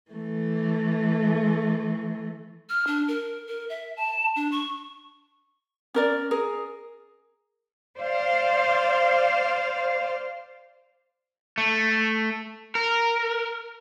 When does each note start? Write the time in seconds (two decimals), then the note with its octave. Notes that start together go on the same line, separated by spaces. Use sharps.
0.11 E3 A3
2.70 F6
2.87 D4
3.08 A#4
3.47 A#4
3.69 E5
3.97 A5
4.36 D4
4.52 C#6
5.94 C#4 A#4 D5
6.31 G#4 A#4
7.96 C5 D5 F5
11.58 A3
12.75 A#4